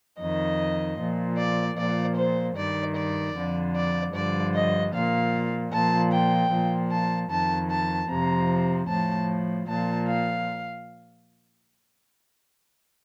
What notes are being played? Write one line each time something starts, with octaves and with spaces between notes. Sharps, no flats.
F2 D#3 D#5
A#2 F3
D5
A#2 F3 D5
C5
G2 D#3 D5
D5
F2 D3 F3
D5
G2 D3 F3 D5
D#5
A#2 F3 F5
A#2 F3 A5
G5
A#2 F3
A5
F2 D#3 A5
A5
F2 C3 F3 A#5
A2 F3 A5
A#2 F3 A5
F5